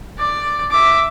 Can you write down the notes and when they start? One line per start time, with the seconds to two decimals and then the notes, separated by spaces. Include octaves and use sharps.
0.19 D5
0.71 E5 D6